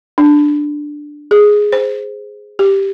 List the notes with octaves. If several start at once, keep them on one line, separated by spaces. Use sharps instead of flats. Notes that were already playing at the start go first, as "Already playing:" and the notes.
D4
G#4
C5
G4